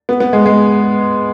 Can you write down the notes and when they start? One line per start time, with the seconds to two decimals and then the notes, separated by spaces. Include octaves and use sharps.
0.09 B3
0.20 B3
0.33 G#3
0.46 G#3